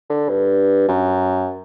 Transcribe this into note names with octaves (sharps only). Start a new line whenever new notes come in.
D3
G2
F#2